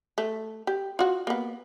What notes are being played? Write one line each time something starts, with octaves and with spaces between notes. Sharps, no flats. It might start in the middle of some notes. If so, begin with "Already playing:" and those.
A3
G4
F4 F#4
A#3 B3